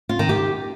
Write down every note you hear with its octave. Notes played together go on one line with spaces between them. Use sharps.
F4
D#3
G4